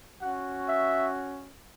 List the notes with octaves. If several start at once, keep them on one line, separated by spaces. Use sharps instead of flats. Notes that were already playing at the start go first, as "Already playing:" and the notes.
C#4 F#4 F#5
E5